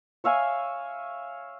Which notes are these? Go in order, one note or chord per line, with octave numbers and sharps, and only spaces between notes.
C#5 E5 F5 G#5